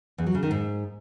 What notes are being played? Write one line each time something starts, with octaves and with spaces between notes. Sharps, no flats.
E2
F#3
C#3
D#3
G#2